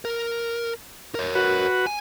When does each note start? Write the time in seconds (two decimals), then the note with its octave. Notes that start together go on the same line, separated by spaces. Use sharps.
0.05 A#4
1.15 A#4 C#5
1.35 F#4 B4
1.87 G#5